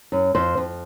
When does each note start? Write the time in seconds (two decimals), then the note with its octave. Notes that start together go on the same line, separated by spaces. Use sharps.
0.12 F#2
0.35 F2 C5
0.57 F2